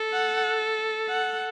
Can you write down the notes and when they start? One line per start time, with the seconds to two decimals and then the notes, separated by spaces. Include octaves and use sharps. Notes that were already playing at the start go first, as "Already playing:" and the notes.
Already playing: A4
0.13 F#5
1.09 F#5